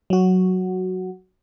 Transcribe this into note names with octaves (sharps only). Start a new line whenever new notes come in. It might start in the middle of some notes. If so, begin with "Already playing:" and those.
F#3 F#4